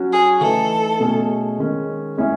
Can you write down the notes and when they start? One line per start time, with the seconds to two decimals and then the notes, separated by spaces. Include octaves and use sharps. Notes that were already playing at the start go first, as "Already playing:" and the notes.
Already playing: F#3 C#4 F#4
0.12 G#4
0.40 E3 A3 D#4 A4
1.00 B2 A3 C#4 G#4
1.58 D#3 G#3 C#4
2.18 G#3 C#4 E4 G#4